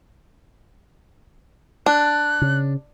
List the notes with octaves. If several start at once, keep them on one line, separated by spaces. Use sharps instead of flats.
D4 F#6
C#3